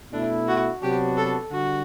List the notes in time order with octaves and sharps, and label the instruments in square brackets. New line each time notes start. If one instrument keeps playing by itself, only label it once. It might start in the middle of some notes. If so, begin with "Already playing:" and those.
[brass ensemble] B2 A3 E4 [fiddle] D4
[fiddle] F#4
[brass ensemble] C3 F#3 B3 D4 F#4 [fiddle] G4
[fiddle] A4
[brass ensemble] D3 G3 [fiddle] F#4